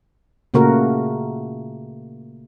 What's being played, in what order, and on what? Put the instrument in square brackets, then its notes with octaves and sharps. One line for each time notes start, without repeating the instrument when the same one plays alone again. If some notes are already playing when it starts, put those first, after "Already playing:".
[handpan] A#2 C#3 A3 A#3 F#4 A#4